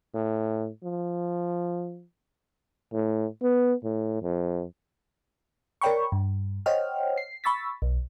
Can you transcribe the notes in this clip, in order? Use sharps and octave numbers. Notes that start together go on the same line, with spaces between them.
A2
F3
A2
B3
A2
F2
A#4 C#5 D5 G5 B5 C#6
G2
C5 C#5 D#5 F#5 G5 F6
C7
B5 C#6 E6 A6 B6
B1